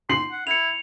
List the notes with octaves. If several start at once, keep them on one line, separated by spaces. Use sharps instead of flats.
C6 C7 F#7
F#5
E4 C#7 F7